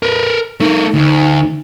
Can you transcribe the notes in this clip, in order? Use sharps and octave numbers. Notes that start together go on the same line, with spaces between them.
A#4 B4
A3 D#4 A#4
D2